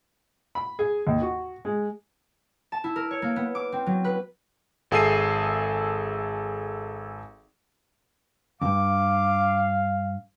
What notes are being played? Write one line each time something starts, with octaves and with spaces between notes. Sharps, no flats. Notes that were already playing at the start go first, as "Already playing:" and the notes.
B5
G#4
D#2
F#4
G#3
A5
E4
A#4
C#5
A#3
B3
D6
C4
F#3
B4
G#1 G#4 A4 E5 C7 D#7
E2 G2 F5 D6